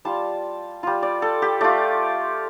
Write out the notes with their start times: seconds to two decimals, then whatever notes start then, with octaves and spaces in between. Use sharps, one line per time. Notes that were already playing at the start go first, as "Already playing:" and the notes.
0.05 G3 F4 A5
0.83 G3 F4
1.03 D5
1.22 A4
1.42 G4
1.61 A3 F4 D5